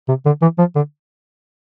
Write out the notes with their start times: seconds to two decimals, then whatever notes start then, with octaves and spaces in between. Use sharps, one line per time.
0.08 C3
0.26 D3
0.42 E3
0.59 F3
0.76 D3